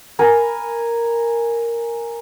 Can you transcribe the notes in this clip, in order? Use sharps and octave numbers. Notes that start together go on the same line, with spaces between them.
A#4 G#5 B5